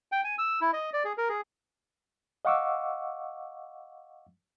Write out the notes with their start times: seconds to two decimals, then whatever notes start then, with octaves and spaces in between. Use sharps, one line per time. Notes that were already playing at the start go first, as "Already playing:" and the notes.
0.12 G5
0.24 G#5
0.38 E6
0.61 E4
0.73 D#5
0.93 D5
1.05 G#4
1.18 A#4
1.29 G#4
2.45 D#5 F5 F#5 C#6 D6 E6